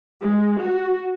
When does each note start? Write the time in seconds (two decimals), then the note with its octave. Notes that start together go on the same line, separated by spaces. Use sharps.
0.21 G#3
0.59 F#4